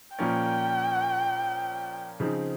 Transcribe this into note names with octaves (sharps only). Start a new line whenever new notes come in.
A#2 F3 A#3 C#4 G5
C#3 F3 C4 D#4